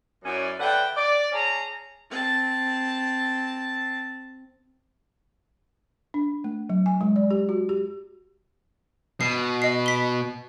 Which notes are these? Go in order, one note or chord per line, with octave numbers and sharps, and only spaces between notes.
F#2 F#3 C#4 E4 D5
D3 A3 B4 F#5 G5
D5
C#4 G#4 A5 A#5
C4 A5
D4
A3
F#3
G#5
G#3
D5
G4
F#4
G4
B2 C7
D#5 C7
B6 G7